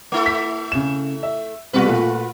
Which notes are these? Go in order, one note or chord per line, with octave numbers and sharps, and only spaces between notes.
A3 E4 A4
B6
C#3 E7
E5
C3 G3 B3 F4 F#4 B4
A#2 A3